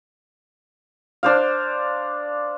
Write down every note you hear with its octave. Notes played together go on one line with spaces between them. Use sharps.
D4 C5 F5